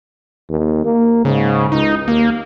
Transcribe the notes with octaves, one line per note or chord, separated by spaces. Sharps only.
D#2
A#3
G#2 C#3
C#2 D#4
D#2 A#3